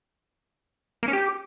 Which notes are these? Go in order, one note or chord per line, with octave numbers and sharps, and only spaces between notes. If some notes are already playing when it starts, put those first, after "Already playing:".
A#3
C#4
G4